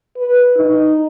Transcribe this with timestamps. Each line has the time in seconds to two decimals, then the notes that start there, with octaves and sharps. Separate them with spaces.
0.17 B4
0.57 D#4